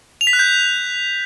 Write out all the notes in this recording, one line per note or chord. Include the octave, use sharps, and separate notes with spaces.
F7
B6
F#6
G6